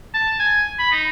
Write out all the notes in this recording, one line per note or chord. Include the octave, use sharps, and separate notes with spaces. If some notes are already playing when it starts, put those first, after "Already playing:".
A5
G#5
B5
D#4